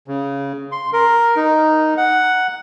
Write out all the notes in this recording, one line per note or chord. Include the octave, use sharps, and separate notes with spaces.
C#3
C6
A#4
D#4
F#5